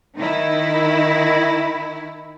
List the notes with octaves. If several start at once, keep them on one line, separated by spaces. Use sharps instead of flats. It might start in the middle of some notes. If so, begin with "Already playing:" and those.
D#3 D#4 E4